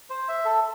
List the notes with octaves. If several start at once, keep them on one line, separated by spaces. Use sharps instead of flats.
C5
E5
A4